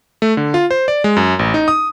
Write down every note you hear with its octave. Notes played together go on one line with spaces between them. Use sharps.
A3
D3
F4
C5
D5
G#3
F#2
A1
D#4
D#6